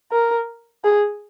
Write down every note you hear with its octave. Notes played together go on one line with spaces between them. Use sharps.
A#4
G#4